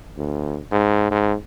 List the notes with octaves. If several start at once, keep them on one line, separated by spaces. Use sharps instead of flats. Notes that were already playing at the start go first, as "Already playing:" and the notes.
D2
G#2
G#2